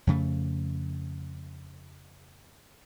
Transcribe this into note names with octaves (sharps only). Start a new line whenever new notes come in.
F2 C#3 A3